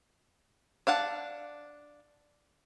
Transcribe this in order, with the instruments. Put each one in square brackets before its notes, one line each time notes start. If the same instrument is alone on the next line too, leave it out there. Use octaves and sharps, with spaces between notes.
[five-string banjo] D4 F5 F#5 A5